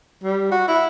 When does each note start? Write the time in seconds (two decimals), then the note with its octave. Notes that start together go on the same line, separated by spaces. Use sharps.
0.24 G3
0.52 F#4
0.68 E4